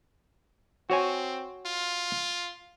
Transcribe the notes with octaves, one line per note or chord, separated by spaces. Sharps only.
C4 F#4 C#5 G#5
F4